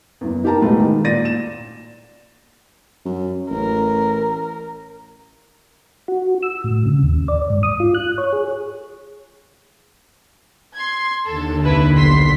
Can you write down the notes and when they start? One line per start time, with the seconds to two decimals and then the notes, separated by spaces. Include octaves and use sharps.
0.21 F#1 E2
0.44 D#4 G4 A#4 A5 A#5
0.62 B1 E2 A2 G#3 A3 B3
0.79 D#3
1.04 A#2 D5 A6 A#6 D#7
1.25 E7
3.05 F#2
3.50 A1 A#4
6.08 F#4
6.43 E6
6.64 A2
6.86 C#3
7.03 D#2
7.28 D5
7.50 G#2
7.63 D#6
7.80 F4
7.95 F#6
8.18 C#5
8.33 G#4
10.75 C6 G#6
11.25 D#2 D3 A4
11.64 C2 E4 B4
11.94 B1 C6 B6